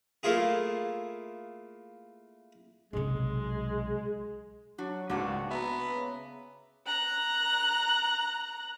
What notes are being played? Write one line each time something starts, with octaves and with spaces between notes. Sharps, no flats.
A3 A#3 E4 F4 G#4
B1 C3 G#3
F#3 D4 F#4
C#2 G#2 A#3 D4 F#4 F#5
B3 B4 E5 A#5
C#3
A#5 F#6